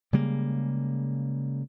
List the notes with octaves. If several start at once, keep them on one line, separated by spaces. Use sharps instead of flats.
C#3 G3 G#3 A#3